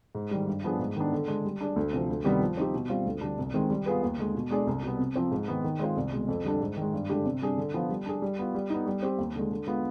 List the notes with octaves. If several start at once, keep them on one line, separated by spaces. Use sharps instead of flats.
G#2
D#3 G3
G2
F3 B3 D4 G#4
G#2
D#3 B3 D4
D3
G#3 D4
G3
D4 G#4 D5
D2
C3 F3
D2
C3 D#3 G3 B3
F3
C4 D#4 G4
B2
G3 C4 F4
D2
D3 G3 D4
C2
C3 D#3 G#3 C4
G3
B3 F4 G#4 B4
D#2
D3 G#3
B2
G#3 D4 G#4 D5
C2
B2 G3 B3
C3
F3 C4
G#2
D#3 G#3 B3
D#3
G#3 C4 F4 C5
C2
B2 G#3
F2
D3 G3 D4
G#2
D#3 G#3
G2
D3 G#3 D4 G4
C3
G3 D4 G#4
D3
F3 B3 F4
G3
D4 G#4
G3
B3 F4
G3
B3 D#4
G3
C4 G4
D#2
D3 G#3
D3
G#3 B3 F4